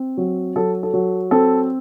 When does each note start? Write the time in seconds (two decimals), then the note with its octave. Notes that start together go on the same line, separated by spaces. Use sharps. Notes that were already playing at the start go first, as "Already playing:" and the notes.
Already playing: C4
0.17 F#3
0.56 F#3 A4
0.83 A4
0.93 F#3
1.31 C4 A4